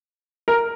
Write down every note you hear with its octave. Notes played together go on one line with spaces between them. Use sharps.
A#4